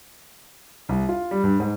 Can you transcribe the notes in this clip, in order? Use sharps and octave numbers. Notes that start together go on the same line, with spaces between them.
C2
F4
G3
G2
G#2